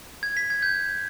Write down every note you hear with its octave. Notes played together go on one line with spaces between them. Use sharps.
G#6
B6
G#6
G6